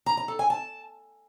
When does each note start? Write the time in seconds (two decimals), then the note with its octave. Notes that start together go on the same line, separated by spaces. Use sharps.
0.06 A#5
0.17 A#5
0.28 A4
0.39 G#5
0.50 A5